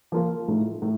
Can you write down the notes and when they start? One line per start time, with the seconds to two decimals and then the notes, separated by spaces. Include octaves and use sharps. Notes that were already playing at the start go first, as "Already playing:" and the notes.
0.12 F3 A#3 F4 A#4
0.48 A2 A3 D#4
0.82 A2